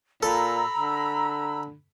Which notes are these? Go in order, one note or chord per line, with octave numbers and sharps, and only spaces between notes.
A#2 A4 A#5 B5 E6
D3